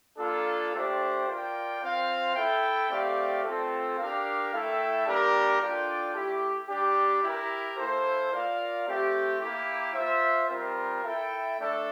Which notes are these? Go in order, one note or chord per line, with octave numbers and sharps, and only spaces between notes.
A#3 D4 F4 A4
A3 D4 G4 C5 G5
F4 A#4 D5 G5
C4 F4 C5 F5
E4 A4 E5 G5
A3 C4 G4 D5 F5
A3 C4 F4 A4
D4 G4 A#4 F5
A3 E4 A4 E5 G5
G3 A#3 D4 G4 A#4
D4 F4 A4 D5 G5
A3 E4 G4
G3 D4 G4
E4 G4 A#4
A#3 E4 A4 C5
F4 A#4 D5 F5
A3 C4 G4
A#3 E4 G4
F4 C5 E5
G3 C4 F4 A#4
E4 A4 E5 G5
A3 D4 A4